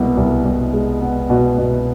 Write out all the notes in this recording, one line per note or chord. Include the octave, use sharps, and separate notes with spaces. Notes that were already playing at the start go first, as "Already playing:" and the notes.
Already playing: C2 B2 G#3 B3
C2
C2
G#3
B3
B2
B2